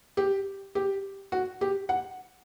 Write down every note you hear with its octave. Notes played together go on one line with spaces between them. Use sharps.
G4
G4
F#4
G4
F#5